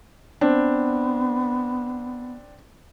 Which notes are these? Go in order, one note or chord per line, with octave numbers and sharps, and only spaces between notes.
B3 C4 D4